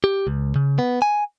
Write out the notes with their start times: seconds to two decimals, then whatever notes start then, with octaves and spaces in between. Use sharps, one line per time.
0.04 G4
0.27 C#2
0.56 C#3
0.79 B3
1.02 G#5